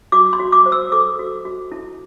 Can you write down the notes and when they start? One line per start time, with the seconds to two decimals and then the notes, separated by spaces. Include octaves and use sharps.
0.12 F#4 D6
0.33 C6
0.40 F#4
0.52 D6
0.66 C5
0.72 E6
0.92 A4 D6
1.19 F#4
1.45 F#4
1.72 E4